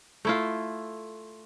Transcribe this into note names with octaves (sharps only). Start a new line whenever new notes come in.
A3 E4 F4